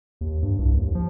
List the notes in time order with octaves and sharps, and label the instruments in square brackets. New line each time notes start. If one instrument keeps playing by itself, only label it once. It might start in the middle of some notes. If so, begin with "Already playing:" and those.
[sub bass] D#2
G2
C2
D#2
F3